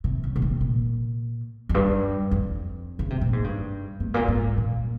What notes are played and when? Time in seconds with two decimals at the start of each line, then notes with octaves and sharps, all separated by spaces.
0.04 C3
0.24 C#3
0.36 A#2
0.42 C3
0.61 A#2
1.69 F2
1.74 G2
2.31 F2
2.99 C#3
3.10 C3
3.21 A#2
3.33 G#2
3.44 G2
4.00 G#2
4.14 A#2
4.28 G#2
4.58 A#2